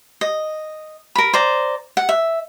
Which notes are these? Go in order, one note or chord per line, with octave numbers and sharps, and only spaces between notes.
D#5
A#4 B5
C5 D5 A#5
F#5
E5